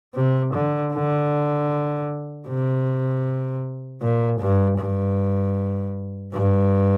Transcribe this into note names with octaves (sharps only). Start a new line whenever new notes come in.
C3
D3
D3
C3
A#2
G2
G2
G2